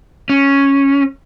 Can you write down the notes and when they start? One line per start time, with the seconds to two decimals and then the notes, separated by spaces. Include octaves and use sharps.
0.29 C#4